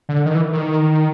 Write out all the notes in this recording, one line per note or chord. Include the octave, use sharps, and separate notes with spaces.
D3
D#3
E3
D#3